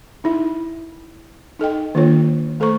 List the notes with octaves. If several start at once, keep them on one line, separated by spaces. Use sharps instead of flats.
D#4 E4 E5
D#4 A4 D#5 G5
D#3 A#3 D4 F4 A4 C#5
A3 A4 C5 A#5 C#6